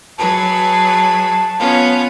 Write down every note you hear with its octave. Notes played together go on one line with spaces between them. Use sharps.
F#3 G#4 B4 A5
B3 C#4 F4